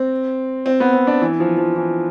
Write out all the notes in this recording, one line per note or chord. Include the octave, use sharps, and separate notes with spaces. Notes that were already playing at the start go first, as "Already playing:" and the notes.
Already playing: C4
C4
B3
C4
D4
E3
F3
F3
E3